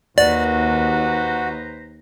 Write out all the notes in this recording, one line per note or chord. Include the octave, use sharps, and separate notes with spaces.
D#2 F#4 B4 C5 D5 A#5